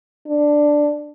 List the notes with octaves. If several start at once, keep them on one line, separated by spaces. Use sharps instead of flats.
D4